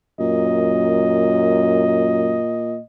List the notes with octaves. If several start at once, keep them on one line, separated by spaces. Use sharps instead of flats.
F#2 A#2 D#5